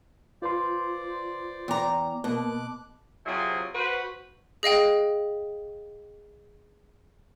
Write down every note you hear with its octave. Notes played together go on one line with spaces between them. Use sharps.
F4 B4 C5 D5 C6
E2 G5 G#5 A#5 D6
B2 A#3 B3 A5 D6 F#6
C3 F#3 E4 F4 G#4 C5
F#4 B4 C5
G#4 D#5 F5 G5